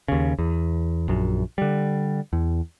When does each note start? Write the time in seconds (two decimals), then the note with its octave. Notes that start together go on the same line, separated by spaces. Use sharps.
0.08 D#2 C#3
0.39 E2
1.08 A#1 F#2
1.58 D3 G3
2.33 E2